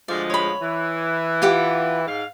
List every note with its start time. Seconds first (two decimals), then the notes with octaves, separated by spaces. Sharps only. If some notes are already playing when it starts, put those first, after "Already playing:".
0.08 D2 F3 G#3 D5
0.30 C#5 B5
0.61 E3
1.42 F4 G4 F#5
2.06 G#2 F5